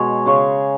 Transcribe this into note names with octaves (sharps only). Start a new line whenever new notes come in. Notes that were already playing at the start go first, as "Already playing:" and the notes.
Already playing: B2 G#3 C#5
C#3 G#3 C#5